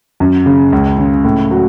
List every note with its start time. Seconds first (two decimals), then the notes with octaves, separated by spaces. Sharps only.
0.20 F#2
0.46 C#3
0.72 C#2
0.98 C#3
1.25 A2
1.51 F#3